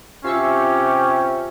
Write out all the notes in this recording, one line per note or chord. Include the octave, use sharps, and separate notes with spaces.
C3 C#4 F4 G4 E5 C#7